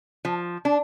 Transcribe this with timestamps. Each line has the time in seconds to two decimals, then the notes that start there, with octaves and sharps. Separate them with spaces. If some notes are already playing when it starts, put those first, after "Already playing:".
0.25 F3
0.65 D4